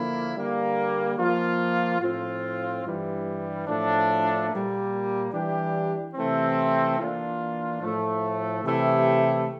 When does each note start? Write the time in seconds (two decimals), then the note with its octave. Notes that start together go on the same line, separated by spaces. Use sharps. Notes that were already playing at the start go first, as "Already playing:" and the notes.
Already playing: D3 F3 A#3 E4
0.35 D3 G3 A#3
1.18 F3 A#3 F4
2.00 A2 F3 C4 F4
2.84 G2 E3 G3
3.67 A2 F3 A3 D4
4.49 A#2 G3 A#3
5.32 E3 G3 D4 G4
6.15 C3 E3 A3 C4
6.98 E3 A#3 D4 F4
7.81 A2 F3 A3
8.64 C3 E3 A3 E4 G4